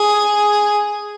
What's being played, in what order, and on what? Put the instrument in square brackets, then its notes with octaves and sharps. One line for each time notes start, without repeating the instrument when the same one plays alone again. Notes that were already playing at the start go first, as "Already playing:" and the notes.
Already playing: [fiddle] G#4